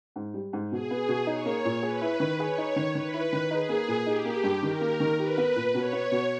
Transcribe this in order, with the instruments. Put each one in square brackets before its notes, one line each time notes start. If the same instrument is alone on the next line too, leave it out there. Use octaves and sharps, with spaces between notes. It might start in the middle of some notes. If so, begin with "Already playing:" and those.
[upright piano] G#2
G3
G#2
[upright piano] B2 [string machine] G#4
[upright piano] B3
B2
[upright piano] D#4 [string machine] C#5
[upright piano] A#3
A#2
[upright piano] G#4 [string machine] B4
[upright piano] E4
D#3
[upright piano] G#4 [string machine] C#5
[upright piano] D#4
D#3
[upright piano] D#3 [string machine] B4
[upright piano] E4
D#3
[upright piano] D#4 [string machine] G#4
[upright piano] A#3
A#2
[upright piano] D#4 [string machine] G4
[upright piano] A#3
G2
[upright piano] D#3 [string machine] A#4
[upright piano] A#3
D#3
[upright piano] G4 [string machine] B4
[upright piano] B3
A#2
[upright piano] B2 [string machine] C#5
[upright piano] B3
B2